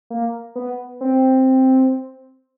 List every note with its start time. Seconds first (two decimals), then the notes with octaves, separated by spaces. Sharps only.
0.10 A#3
0.56 B3
1.01 C4